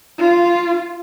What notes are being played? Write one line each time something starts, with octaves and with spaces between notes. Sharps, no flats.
F4